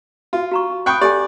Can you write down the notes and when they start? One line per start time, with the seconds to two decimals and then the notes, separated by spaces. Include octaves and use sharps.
0.33 F4 F#4
0.51 F#4 A#5 C#6
0.86 F#5 G5 B5 C#6 D#6 F#6
1.01 G4 A4 D5 G#5